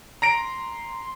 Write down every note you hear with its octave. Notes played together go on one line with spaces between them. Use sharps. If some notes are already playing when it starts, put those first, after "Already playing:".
A#5 C6 A#6 D7